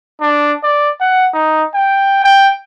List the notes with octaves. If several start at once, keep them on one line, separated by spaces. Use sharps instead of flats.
D4
D5
F#5
D#4
G5
G5